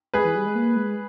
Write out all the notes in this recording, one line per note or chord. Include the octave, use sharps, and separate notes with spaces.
G#3 G#4 B4
E3
G3
G#3
A#3
G#3